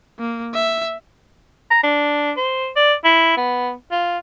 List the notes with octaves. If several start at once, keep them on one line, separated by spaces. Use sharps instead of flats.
A#3
E5
A#5
D4
C5
D5
E4
B3
F4